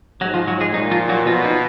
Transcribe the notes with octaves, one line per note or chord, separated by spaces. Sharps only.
G#2 F#3 F#4
F3 F4
F#3 F#4
G#3 G#4
A#2 D#4
F3 F4
F#3 F#4
B2 F3 F4
D#4